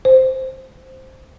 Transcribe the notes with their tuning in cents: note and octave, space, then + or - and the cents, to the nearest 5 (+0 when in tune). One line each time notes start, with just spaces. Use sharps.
C5 +0